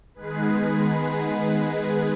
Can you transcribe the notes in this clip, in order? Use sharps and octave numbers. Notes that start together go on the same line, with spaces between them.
D#3 G#3 B3 G#4 B4